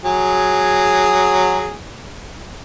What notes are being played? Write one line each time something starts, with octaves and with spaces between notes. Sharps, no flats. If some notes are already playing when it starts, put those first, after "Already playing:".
F#3 G#4